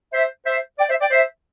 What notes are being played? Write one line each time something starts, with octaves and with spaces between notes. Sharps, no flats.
C5 E5
C5 E5
D5 G5
C5 E5
D5 G5
C5 E5